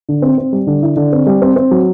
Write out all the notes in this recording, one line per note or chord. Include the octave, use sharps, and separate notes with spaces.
D3
C4
C4
G3
D3
E4
D3
C4
G3
C4
C4
F#3